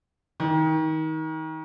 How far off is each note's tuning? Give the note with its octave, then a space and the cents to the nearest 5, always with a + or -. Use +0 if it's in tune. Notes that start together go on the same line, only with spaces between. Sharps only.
D#3 +30